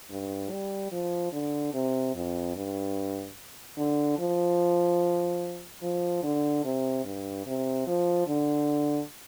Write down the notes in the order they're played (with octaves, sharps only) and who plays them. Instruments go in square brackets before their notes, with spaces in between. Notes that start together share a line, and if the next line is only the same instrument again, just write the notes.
[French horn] G2
G3
F3
D3
C3
F2
G2
D3
F3
F3
D3
C3
G2
C3
F3
D3